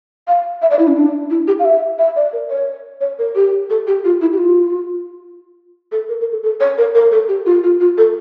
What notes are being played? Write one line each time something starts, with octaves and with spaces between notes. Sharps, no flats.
F5
E5
D5
E4
C#4
D4
E4
G4
F5
E5
E5
D5
A#4
C#5
C#5
A#4
G4
A4
G4
F4
E4
G4
F4
A4
A#4
A#4
A4
A4
C#5
A#4
A#4
A4
G4
F4
F4
F4
A4